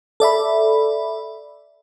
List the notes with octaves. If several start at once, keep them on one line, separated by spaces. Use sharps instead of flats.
A4 D5 E5 B5